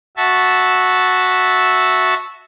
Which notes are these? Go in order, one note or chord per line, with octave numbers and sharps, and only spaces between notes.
F#4 E5 A5